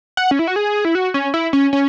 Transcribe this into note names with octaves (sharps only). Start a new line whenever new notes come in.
F#5
C#4
E4
F#4
G#4
E4
F#4
C#4
E4
C#4
C#4